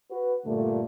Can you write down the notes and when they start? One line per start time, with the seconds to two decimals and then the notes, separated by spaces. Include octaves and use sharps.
0.11 F#4 B4
0.45 G2 A#2 D3 A3